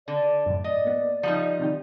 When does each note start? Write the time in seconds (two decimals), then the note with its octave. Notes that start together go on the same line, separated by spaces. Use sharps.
0.08 D3 D5 A#6
0.46 F#2 A2
0.64 D5 D#5
0.85 A#3 B3
1.23 F3 G3 D#4
1.60 C3 D#3 G4